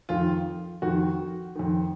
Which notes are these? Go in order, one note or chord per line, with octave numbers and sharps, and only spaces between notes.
F2 D#3 F4
F2 D#3 F#4
F2 D#3